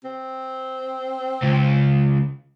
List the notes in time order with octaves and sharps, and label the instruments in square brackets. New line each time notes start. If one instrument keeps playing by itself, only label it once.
[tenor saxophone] C4
[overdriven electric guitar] C#2